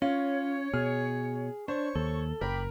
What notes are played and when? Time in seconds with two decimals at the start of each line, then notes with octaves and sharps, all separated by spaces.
0.02 C#4 F4 C#5
0.74 B2 G#4 F6
1.68 D4 C5 C#5 C#6
1.95 D#2 A4
2.41 F#1 A#4 G5 B5 D6